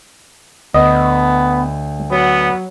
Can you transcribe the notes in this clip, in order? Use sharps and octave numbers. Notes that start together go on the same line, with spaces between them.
D2 B3 D#5
F#3 B3